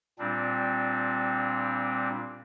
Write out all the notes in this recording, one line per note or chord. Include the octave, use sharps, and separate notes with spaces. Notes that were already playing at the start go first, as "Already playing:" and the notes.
A#2 G3 C4 D4